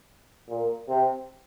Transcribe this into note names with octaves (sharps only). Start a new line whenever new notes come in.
A#2
C3